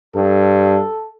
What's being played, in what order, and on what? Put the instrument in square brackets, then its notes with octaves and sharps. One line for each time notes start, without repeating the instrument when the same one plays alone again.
[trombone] G2 [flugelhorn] A4